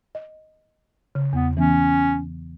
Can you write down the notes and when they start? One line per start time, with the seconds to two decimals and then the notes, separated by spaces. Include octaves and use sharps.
0.15 D#5
1.15 C#3
1.33 E2 B3
1.57 E3 B3 C#4